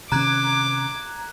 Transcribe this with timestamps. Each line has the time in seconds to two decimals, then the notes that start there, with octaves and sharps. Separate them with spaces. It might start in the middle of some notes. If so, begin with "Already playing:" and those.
0.12 C3 D#3 C#4 A#5 D6 F#6 G#6